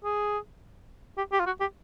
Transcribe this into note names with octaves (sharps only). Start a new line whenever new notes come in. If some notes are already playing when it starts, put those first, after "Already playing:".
G#4
G4
G4
F4
F#4
G4